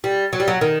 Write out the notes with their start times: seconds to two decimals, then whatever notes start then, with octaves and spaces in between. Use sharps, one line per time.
0.04 G3
0.33 F#3
0.40 G3
0.48 F#3
0.61 D#3